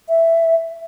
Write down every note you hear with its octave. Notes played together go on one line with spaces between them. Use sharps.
E5